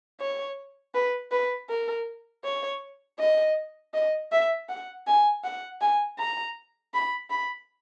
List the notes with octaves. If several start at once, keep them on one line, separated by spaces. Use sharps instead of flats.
C#5
B4
B4
A#4
C#5
D#5
D#5
E5
F#5
G#5
F#5
G#5
A#5
B5
B5